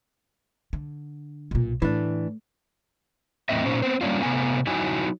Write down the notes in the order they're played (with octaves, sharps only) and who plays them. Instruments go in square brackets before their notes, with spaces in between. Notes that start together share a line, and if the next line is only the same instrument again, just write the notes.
[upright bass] D3
B1 A#2
[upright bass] A2 [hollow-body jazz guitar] E3 D4
[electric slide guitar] E2 A2 C4 D#5 E5
A#2 C#4 D#4 C5
B3 C4 C5
G3 A#3 C#4 D4 F4
C3 A3 B3 G#5
F#3 D#4 E4 F#4 G#5